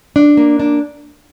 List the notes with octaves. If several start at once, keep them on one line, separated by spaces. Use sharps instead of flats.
D4
A#3
D4